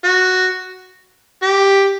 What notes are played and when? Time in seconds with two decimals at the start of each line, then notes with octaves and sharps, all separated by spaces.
0.04 F#4
1.43 G4